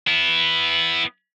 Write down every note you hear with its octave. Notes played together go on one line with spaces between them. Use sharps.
B3 E4